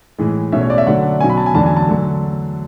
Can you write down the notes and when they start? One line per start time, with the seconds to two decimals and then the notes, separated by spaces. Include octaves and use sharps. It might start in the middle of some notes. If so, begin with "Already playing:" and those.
0.18 A2 E3 G#3
0.52 B2 A3 C#4 E5
0.61 C#5
0.70 D5
0.78 E5
0.87 D3 F#3 A3 D4 F#5
1.21 B2 F#3 C#4 G#5
1.30 B5
1.38 A5
1.46 G#5
1.54 E2 D3 F#3 A3 D4 A5
1.66 G#5
1.77 A5
1.89 D3 F#3 A3